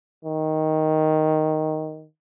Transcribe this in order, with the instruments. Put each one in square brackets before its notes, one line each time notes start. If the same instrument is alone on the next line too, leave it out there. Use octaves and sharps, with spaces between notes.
[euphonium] D#3